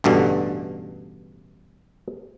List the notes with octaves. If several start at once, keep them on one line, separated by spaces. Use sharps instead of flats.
A1 G2 B2 D3